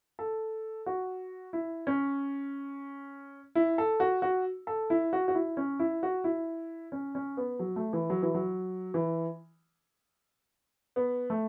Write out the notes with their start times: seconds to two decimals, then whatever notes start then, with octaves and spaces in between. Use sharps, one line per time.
0.19 A4
0.86 F#4
1.53 E4
1.87 C#4
3.55 E4
3.78 A4
4.00 F#4
4.22 F#4
4.67 A4
4.90 E4
5.13 F#4
5.28 F#4
5.35 E4
5.57 C#4
5.79 E4
6.03 F#4
6.24 E4
6.92 C#4
7.15 C#4
7.37 B3
7.59 F#3
7.76 A3
7.93 E3
8.10 F#3
8.22 E3
8.34 F#3
8.94 E3
10.96 B3
11.30 A3